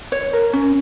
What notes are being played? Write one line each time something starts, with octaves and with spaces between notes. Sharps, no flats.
C#5
A#4
C#4